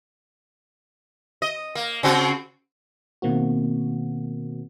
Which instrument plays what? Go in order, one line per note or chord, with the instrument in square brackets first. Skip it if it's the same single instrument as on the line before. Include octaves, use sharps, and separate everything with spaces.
[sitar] D#5
A#3
C#3 C4 F#4
[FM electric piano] B2 D#3 A#3 C4 F#4